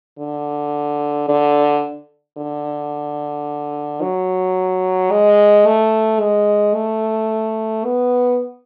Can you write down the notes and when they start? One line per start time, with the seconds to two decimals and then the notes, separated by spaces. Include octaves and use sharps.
0.19 D3
1.28 D3
2.38 D3
4.02 F#3
5.11 G#3
5.67 A3
6.20 G#3
6.75 A3
7.85 B3